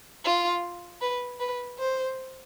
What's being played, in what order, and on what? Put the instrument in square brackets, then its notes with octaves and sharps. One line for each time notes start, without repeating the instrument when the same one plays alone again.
[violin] F4
B4
B4
C5